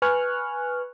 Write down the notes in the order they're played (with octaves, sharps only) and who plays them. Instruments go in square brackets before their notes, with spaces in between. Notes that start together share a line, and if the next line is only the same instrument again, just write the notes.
[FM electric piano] B4 G#5 C#6 F6 F#6